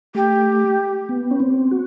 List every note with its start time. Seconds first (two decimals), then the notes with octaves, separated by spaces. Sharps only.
0.15 A3 G4
1.09 B3
1.31 C#4
1.40 C4
1.71 F#4